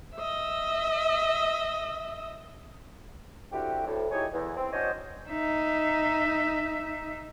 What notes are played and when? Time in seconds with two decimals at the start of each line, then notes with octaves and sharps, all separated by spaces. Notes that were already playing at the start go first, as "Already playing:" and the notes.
0.15 D#5 E5
3.52 F2 D3 E4 F#4 G4
3.86 D2 A2
4.11 D#4 E4 G4 G#4 C#5
4.32 E2
4.57 C4
4.72 C#4 D4 F#4 C5 C#5 D#5
5.29 D#4 E5